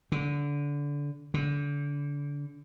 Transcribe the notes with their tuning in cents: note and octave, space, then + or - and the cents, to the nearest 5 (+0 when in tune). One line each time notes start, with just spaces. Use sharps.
D3 -20
D3 -30